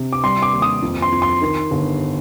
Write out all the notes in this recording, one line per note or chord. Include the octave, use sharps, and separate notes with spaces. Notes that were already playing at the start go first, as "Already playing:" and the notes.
Already playing: C3
D6
G3 C6
D6
D#2
D#6
F2
C6
F2
C6
D#3
G1